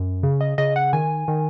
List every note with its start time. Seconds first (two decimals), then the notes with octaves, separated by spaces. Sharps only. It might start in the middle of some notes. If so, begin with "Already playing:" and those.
Already playing: F#2
0.23 C#3
0.41 D#5
0.58 C#3 D#5
0.76 F#5
0.93 D#3 G#5
1.28 D#3